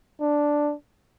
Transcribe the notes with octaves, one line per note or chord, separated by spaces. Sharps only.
D4